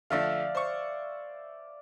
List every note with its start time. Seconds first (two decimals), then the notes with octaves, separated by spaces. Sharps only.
0.10 D3 F3 A3 D5 E5 F5
0.55 C5 C#6